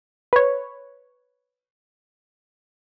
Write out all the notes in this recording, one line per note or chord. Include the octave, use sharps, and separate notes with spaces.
B4 C#5